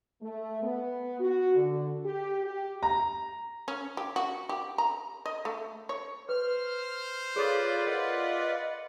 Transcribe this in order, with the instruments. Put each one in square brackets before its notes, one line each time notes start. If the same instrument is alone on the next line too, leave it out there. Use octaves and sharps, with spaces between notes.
[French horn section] A3
B3
F#4
D3
G4
G4
[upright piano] A#5
[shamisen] C#4
G4
F#4
G4
A#5
D#5
A3
C#5
[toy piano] B4 [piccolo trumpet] C5 [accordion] F6
[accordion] F4 B4 D5 [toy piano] G#4 A4 [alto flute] C#5
[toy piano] A#4 [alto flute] D#5 [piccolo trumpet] F#5